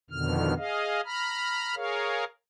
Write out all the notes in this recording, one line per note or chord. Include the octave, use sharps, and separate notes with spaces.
F2 B2 D3 D#3 F6
G#4 D#5 F5
A#5 B5 F6
G#4 A#4 C#5 F5